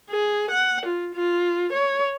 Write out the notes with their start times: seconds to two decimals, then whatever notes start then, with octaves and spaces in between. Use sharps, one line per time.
0.10 G#4
0.51 F#5
0.86 F4
1.14 F4
1.72 C#5